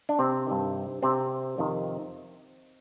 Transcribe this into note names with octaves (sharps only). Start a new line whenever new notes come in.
D4
C3 C4
G2 D#3
C3 C4
F2 C3 D#3